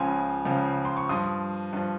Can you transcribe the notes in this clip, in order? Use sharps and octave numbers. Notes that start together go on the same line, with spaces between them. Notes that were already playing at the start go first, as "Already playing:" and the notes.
Already playing: C#2 C#3 F3 G#5 C6
C#2 C#3 F3
C6
C#6
G2 F3 C6 D#6
G2 F3